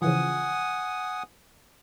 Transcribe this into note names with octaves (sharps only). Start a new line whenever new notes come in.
C#3 E3 F3 F#5 G#5 D#6